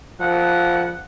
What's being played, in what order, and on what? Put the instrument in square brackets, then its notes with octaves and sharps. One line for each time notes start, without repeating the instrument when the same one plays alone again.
[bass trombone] F3 [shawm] F#5